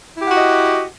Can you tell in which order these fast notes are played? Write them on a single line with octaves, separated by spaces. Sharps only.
E4 G4 F#5 F#4 D#5